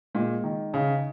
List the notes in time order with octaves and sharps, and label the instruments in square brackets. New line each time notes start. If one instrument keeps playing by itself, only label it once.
[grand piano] A#2 [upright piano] G#3
[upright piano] D#3
[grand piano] C#3 [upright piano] D#4